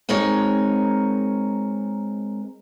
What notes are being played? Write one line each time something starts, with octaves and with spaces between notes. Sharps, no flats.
G#3 C4 D#4 A#4 C#5